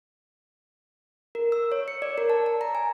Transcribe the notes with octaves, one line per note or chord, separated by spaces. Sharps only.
A#4
E6
C#5
C#7
D5
A#4
A5
A5
A#5
G#5